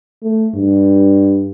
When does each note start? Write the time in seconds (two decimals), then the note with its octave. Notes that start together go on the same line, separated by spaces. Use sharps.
0.23 A3
0.55 G2